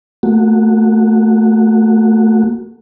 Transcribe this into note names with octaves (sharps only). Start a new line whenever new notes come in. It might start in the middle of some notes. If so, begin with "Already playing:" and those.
A3 A#3 F#4